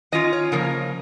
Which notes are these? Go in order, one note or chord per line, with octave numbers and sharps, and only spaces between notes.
D#3 C#4 F4 D#5
C#5
C#3 F3 A#3 A#4